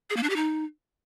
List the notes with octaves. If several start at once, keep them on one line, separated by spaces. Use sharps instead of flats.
G#4
A#3
D4
G4
D#4